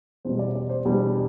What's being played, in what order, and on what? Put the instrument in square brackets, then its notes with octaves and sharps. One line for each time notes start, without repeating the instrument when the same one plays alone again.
[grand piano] E2 B2 G3 C5
D5
D5
C5
E2 B2 G3 D4